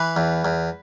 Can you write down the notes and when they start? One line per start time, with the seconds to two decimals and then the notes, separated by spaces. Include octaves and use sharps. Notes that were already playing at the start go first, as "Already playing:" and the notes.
Already playing: E3 B4
0.16 E2
0.45 E2